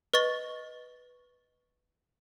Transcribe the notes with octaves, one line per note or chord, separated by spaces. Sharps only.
B4 D#5 C#6 A6 G7